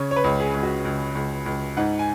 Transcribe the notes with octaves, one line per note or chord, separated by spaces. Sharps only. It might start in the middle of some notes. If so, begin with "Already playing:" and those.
Already playing: C#3 C#5
C#5
B4
C#2
G#4
C#2
F#4
C#2
C#2
C#2
G#2 F#5
G#5